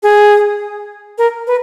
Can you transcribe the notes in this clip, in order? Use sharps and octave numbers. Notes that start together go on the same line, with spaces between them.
G#4
A#4
B4